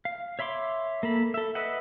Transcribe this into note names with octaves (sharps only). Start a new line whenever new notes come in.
F5
C#5 E5 B5 C6 D6
A#3 A4 B5
A4 E5
B4 D#5 E5 F#5